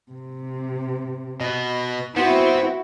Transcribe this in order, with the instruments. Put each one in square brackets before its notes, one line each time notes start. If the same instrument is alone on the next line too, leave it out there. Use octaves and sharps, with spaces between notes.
[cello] C3
[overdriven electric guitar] B2 B3 [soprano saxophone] D#5
[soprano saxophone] B3 [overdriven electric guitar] C4 C5 [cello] E4 F#4